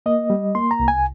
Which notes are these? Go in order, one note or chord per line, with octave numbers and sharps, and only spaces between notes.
A#3 D#5
G3
A#3 C6
A#5
C2
G#5